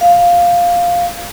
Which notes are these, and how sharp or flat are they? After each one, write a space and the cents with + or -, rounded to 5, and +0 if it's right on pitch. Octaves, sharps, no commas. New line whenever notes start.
F5 +5